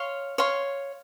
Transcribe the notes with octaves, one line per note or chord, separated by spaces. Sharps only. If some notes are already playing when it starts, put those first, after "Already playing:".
Already playing: C#5 F5 C6
C#5 F5 C6